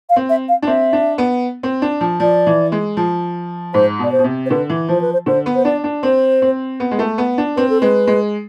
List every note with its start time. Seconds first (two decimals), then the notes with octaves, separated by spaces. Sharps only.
0.09 F5
0.16 C4
0.29 E5
0.49 F5
0.62 D4
0.67 C4 E5
0.93 D4
1.18 B3
1.63 C4
1.82 D4
2.01 F3
2.20 F3 D5
2.47 E3
2.72 G#3
2.97 F3
3.74 G#2 C5
3.99 B2 D5
4.12 C5
4.19 B2
4.24 C3
4.46 C5
4.50 D3 B4
4.69 E3
4.89 F3 C5
5.01 B4
5.13 C5
5.26 D3 C5
5.46 B3
5.55 C5
5.65 D4 D5
5.84 D4
6.03 C4 C5
6.42 C4
6.80 B3
6.91 G#3
6.99 A3
7.18 B3
7.38 D4
7.56 C4 B4
7.70 A4
7.81 G#3 B4
8.07 G#3